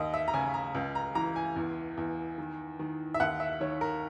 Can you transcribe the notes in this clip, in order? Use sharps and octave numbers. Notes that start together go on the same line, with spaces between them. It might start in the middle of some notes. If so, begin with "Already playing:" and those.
Already playing: D#2 D#5
E5
A#5
C#3 G#5
A#5
C#2
A#5
E3 A#5
G#5
E2
E2
D#3
D#3
E5
D#2 F#5
E5
D#3 C#5
A#4